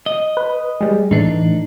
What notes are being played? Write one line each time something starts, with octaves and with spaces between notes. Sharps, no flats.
D#5
B4
G3 G#3
A2 E3 D4 D#4